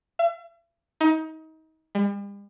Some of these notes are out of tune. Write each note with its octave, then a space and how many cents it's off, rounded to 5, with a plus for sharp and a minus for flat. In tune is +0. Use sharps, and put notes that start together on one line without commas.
E5 +45
D#4 +30
G3 +45